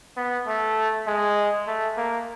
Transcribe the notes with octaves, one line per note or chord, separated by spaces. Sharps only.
B3
A3
G#3
A3
A#3